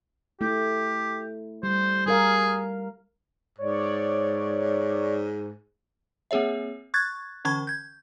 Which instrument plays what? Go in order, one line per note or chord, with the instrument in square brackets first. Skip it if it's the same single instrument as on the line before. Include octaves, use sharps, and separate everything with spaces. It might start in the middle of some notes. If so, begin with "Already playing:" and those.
[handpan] A3 E4 [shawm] G4
[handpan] G3 [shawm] C5
[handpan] G3 A#4 F5 [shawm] G#4
[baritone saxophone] G#2 [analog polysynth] C#5 D5
[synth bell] A#3 C4 G#4 C#5 E5
C#6 F#6 G#6 A6
D3 E3 C#4 B5 C#6 G#6
G6 G#6